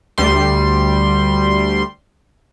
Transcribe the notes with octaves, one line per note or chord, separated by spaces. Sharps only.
D2 G3 C6